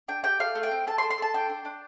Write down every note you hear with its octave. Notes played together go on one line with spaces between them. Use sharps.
D4 G5
G4 G5
A3 F5
A3
G5
C4
A4 A5
C6
A4
C6
A4 A5
D4 G5
D4
D4